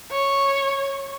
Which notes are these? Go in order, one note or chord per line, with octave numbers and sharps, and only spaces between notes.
C#5